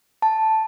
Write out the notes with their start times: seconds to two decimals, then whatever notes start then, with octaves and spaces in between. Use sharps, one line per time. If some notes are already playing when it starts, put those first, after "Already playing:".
0.22 A5